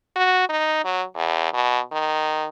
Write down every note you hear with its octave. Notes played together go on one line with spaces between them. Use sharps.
F#4
D#4
F#3
E2
B2
D#3